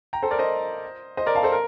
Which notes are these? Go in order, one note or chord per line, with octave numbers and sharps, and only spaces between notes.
G5 A#5
A4 C5
A#4 D5
C5 D#5
C5 D#5
A#4 D5
F5 A5
A4 C5
A#4